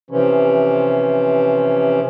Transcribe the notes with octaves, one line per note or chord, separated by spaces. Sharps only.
C3 E3 F3 C#4